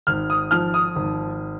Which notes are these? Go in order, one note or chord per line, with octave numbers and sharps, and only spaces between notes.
G#1 F6
D#6
F3 F6
D#6
G#1